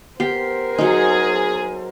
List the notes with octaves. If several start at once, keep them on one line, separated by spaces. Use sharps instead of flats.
B3 G4 A#4 C5 C7
F#3 D#4 G#4